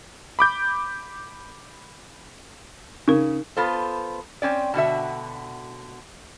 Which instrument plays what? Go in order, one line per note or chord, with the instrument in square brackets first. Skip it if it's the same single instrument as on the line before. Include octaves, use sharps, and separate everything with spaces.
[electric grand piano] B5 D6 G6
[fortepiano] C#3 [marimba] D#4 A#4
[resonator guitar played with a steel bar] B3 F4 A4 C5
C4 C#4 D5
B2 D3 F#4 E5